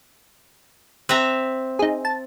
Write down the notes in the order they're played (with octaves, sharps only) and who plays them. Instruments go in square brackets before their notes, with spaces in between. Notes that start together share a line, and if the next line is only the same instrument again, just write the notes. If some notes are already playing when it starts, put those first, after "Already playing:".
[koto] C4 E5 A#5 [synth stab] F#6 A#6
[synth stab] D#4 G#4
A5